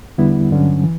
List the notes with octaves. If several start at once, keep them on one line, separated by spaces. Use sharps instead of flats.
E2 D3 G3 B3 E4
G2 D3 F#3 C#4
E3